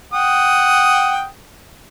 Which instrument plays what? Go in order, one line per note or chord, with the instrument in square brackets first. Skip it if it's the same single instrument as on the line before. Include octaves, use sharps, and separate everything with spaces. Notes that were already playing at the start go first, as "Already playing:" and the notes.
[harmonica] F#5 G5 D#6